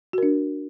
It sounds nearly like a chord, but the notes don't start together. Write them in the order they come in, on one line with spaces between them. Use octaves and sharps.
F#4 A#4 D4